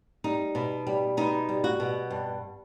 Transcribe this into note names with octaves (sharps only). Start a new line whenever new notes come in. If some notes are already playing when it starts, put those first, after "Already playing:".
G3 D#4
B2
G3
B2 D#4
G3
F#4
B2
G2